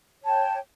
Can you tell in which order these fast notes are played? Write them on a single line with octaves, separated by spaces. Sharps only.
C#5 A5 G5